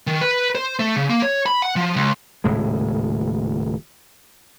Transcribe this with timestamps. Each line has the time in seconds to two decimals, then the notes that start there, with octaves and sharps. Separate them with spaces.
0.07 D#3
0.21 B4
0.55 C5
0.79 A3
0.96 C#3
1.10 A#3
1.23 C#5
1.46 B5
1.62 F#5
1.76 F3
1.96 C#2
2.44 D#1 A2 C#3 G#3